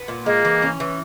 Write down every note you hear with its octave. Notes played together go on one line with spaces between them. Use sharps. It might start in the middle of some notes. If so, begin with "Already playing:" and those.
Already playing: B3
A#2
G#3 A#3
E3
C#4
E3